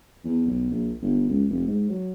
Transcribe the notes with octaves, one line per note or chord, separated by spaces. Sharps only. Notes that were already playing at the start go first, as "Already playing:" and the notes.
E2
B1
A#1
G1
C#2
F1
G#2
F#3